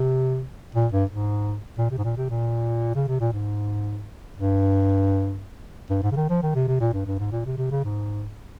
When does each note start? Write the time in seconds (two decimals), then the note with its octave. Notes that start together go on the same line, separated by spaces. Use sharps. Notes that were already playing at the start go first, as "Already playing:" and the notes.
Already playing: C3
0.75 A#2
0.92 G2
1.09 G#2
1.78 A#2
1.90 C3
1.98 G#2
2.04 A#2
2.17 C3
2.30 A#2
2.95 C#3
3.08 C3
3.20 A#2
3.33 G#2
4.36 G2
5.90 G2
6.03 G#2
6.12 C#3
6.16 D#3
6.29 F3
6.43 D#3
6.55 C3
6.68 C3
6.80 A#2
6.93 G2
7.06 G2
7.19 G#2
7.32 A#2
7.46 C3
7.57 C3
7.71 C#3
7.84 G#2